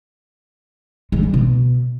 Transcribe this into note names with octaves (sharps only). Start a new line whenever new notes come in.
G#3
G3
B2